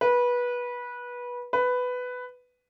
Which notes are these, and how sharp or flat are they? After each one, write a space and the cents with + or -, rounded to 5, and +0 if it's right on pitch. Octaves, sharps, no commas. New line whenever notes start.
B4 -20
B4 +10